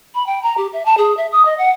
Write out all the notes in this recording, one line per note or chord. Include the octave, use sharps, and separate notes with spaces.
B5
G5
A#5
G4
E5
A5
G#4
E5
D#6
D#5
F#5